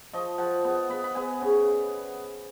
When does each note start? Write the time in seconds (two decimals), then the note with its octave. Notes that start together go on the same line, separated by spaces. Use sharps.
0.13 F3 D#5
0.38 F3 F#5
0.64 B3
0.89 B3 B5
1.04 B5
1.15 B3 G#5
1.41 C#3